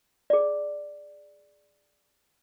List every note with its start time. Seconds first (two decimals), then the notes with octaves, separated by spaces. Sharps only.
0.30 G#4 D5